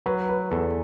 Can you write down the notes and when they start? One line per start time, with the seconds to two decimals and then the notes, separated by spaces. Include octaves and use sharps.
0.06 F#3 B4
0.29 B4
0.51 E2 A4